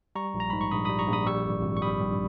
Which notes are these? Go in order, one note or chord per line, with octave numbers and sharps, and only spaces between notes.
G3 A#5 C#6
A#1
A#5
G#2 B5
C#6
A#1 B5 D#6
B5 D#6
G3
A#5 C#6
A#1 B5 D#6
G3 C#6 E6
G#1
G#1
C#6
G3 B5 D#6
G2